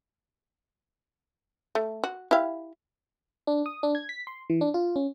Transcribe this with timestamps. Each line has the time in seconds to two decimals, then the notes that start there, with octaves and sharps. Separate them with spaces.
1.75 A3
2.04 F#4
2.31 E4 G4 F5
3.47 D4
3.66 D#6
3.83 D4
3.95 G#6
4.09 B6
4.27 C6
4.50 E3
4.61 D4
4.74 F4
4.96 C#4